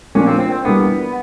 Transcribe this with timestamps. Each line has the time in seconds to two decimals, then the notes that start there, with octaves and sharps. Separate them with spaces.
0.15 A#2 F3 A#3 C#4 D4
0.27 C4
0.40 C4
0.52 C4
0.65 E3 G3 A#3 B3 D4 F4